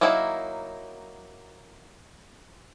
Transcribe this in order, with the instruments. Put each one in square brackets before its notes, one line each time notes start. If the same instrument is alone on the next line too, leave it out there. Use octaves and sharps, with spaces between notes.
[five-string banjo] F#3 A#3 D#4 E4